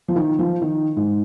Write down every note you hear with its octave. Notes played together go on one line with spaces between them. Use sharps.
F3
D#3
F3
D#3
G#2